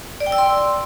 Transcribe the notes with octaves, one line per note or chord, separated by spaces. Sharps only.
D5
G5
E6
C6